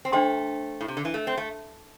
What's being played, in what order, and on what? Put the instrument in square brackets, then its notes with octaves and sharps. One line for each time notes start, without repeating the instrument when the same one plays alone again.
[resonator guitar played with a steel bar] C4
[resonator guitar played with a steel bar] A3 [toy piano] D4 C5 G5 C6
[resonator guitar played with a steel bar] A2
C3
D3
E3
A3
C4
A3